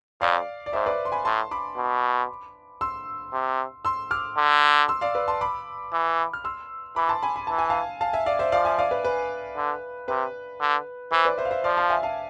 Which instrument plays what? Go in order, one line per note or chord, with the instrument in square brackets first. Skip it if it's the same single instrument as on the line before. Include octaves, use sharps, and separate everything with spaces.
[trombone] F2 [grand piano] D5 F5
[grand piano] D5
[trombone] G#2 [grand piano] C5 E5
[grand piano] B4 D5
C6
G#5 B5
[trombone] A2 [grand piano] A5 C6
[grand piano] B5 D6
[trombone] B2
[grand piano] C6 E6
[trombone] C3
[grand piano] C6 E6
D6 F6
[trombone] D3
[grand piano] C6 E6
D5 F5
B4 D5
A5 C6
B5 D6
[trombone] E3
[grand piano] F6
C6 E6
[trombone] E3 [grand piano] B5 D6
[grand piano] A5 C6
G#5 B5
B5
[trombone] E3 [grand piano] A5
[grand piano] G#5
F5 A5
F5 A5
E5 G#5
D5 F5
C5 E5
[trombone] F3 [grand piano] D5 F5
[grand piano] E5 G#5
D5 F5
B4
B4
[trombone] D3
[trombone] C3 [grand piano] B4
[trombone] D3
[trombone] E3 [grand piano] C5
[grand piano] B4 D5
C5 E5
F5
C5 E5
[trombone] F3 [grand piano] D5 F5
[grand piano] F5 A5
E5 G#5
F5 A5